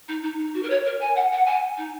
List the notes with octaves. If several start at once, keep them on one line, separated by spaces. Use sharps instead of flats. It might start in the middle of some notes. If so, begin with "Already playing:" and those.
D#4
D#4
D#4
F#4
A#4
C#5
A#4
G#5
F#5
F#5
G#5
D#4